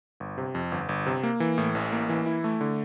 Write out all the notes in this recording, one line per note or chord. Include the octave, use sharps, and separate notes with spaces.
G1
C3
F2
G1
G1
C3
A#3
E3
A2
A1
A#3
E3
E4
A3
D3